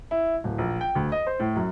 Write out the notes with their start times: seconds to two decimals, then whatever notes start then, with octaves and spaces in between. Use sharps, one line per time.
0.11 E4
0.44 D1
0.58 A#1
0.81 G5
0.95 D2
1.12 D#5
1.27 C5
1.40 A2
1.56 F#2